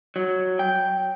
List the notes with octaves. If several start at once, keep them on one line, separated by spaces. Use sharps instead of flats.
F#3
G5